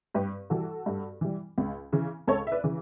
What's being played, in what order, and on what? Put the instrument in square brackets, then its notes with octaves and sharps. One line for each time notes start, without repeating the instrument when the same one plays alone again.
[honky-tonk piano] G2 G4 B4
E3 G3 F#4 A4
G2
E3 G3
C#2
C#3 E3
C#2 A4 C#5
E5
B4 D5
C#3 E3